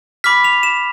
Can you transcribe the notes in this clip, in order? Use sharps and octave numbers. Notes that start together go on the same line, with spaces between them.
B5 D6 F6 B6
F7
E7